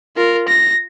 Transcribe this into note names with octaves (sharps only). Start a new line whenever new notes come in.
F4 A#4
A#6